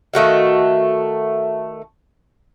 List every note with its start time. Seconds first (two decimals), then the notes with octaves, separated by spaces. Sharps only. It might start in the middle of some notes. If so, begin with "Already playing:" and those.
0.13 D#3 A3 F#4 F5